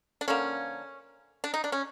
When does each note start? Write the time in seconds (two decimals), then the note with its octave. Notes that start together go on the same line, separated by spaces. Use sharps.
0.21 D4
0.28 D3 F3 A#3 C#4
1.44 D4
1.54 D#4
1.64 D4
1.72 C#4